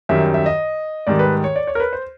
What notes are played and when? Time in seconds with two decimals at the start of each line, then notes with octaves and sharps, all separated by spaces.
0.09 F#2 D#3 G3 E5
0.34 E5
0.46 D#5
1.07 G#2 D#3 G3 D5
1.19 B4
1.44 C#5
1.56 D5
1.67 C#5
1.75 A#4
1.80 B4
1.93 C5